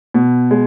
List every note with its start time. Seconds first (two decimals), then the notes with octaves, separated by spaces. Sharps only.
0.14 B2
0.51 G#3